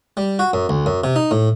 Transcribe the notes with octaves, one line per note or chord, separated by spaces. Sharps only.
G3
F#4
F#2
D2
F#2
C3
D#4
A2